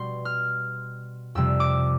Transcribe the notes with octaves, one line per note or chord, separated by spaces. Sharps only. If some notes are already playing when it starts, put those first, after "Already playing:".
Already playing: B2 G3 C6
F6
F2 C3 G3 E6
D6